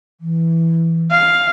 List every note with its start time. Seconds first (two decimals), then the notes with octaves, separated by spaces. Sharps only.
0.21 E3
1.11 F5